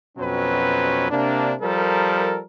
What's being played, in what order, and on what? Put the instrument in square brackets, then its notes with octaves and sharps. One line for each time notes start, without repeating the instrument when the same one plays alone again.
[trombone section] F2 B2 F#3 C4 C#4 B4
C3 A#3 D4
F3 G3 A4 A#4